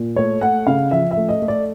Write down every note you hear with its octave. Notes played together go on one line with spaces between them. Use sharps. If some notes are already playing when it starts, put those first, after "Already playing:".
Already playing: A#2
A3 C#5
A3 F#5
C#3 F5
F3 E5
E5
A3
D#5
A3
D5